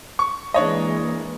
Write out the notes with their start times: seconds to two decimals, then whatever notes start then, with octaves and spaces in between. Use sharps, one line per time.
0.19 C#6
0.54 E3 G#3 A#3 D4 C#5 D#5